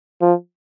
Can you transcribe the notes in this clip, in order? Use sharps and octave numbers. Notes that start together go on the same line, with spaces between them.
F3